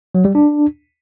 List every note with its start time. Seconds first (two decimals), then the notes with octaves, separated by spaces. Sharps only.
0.15 F#3
0.25 G3
0.35 D4